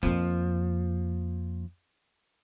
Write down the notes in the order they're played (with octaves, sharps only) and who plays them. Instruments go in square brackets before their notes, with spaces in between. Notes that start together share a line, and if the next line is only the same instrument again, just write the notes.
[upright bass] F2 A#3 [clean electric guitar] F3